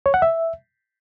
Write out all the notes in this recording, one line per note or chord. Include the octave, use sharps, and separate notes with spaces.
C#5
F#5
E5